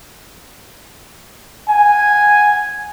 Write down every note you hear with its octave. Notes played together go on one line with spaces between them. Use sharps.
F#5 G#5